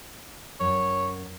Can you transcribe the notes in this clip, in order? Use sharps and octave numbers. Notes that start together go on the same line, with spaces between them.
F#2 C#5